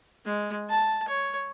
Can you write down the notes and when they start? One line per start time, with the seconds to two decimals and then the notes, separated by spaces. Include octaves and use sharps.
0.25 G#3
0.69 A5
1.08 C#5